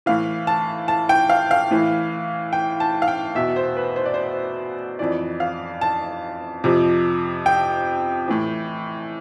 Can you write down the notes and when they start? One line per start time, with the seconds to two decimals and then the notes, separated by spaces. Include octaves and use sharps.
0.06 A2 E3 F5
0.47 A5
0.88 A5
1.09 G5
1.29 F5
1.51 F5
1.71 A2 E3
2.53 G5
2.80 A5
3.02 F5
3.08 G5
3.35 E2 B2 E5
3.56 C5
3.77 B4
3.96 C5
4.06 D5
4.14 C5
4.99 F2 E3 D5
5.40 F5
5.81 A5
6.64 F2 C3 F3
7.46 G5
8.28 A2 E3